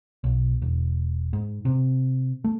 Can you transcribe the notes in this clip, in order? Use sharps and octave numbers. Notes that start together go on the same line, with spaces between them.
B1
E1
G#2
C3
A3